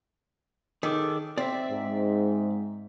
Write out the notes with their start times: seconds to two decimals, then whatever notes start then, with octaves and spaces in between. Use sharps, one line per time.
0.83 D#3 G#4 A4 D6
1.38 C4 D5 E5
1.70 G#2